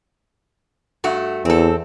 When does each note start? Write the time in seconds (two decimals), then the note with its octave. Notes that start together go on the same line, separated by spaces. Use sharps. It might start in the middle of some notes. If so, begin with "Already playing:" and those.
1.04 G2 A3 F#4
1.45 E2 C4 A4